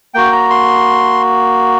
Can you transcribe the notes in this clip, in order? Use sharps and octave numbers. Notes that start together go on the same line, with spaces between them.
A#3 F#4 G5
A#5
C6